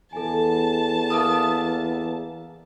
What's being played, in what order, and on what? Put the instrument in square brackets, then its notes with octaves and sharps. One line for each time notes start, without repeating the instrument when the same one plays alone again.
[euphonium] E2 [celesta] A4 G#5 [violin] A5
[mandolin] A#3 E5 D#6